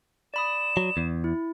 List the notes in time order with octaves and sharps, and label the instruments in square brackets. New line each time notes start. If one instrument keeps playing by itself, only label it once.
[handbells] D5 B5 D#6 [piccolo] E7
[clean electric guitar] F#3
E2
[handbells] E4